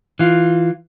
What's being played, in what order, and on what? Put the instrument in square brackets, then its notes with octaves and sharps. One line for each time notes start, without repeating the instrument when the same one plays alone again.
[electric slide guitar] E3 F4